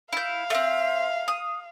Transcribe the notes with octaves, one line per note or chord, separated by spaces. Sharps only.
E4 F5 G6
A3 C4 E5
D#6